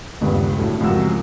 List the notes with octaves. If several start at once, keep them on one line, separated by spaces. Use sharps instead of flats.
D#1 C#2 G2 C#3 G3 B3
D2 A2 F#3 A3 C#4
C#2 F#2 C3 F3 F#4 E6